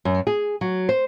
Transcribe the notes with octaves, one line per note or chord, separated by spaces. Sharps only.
F#2
G#4
F#3
C5